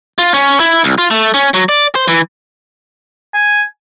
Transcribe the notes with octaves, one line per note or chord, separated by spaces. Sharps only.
F4
C#4
E4
C2
F4
A3
C#4
F#3
D5
C5
E3
G#5